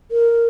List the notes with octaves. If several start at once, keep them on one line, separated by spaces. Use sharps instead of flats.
A#4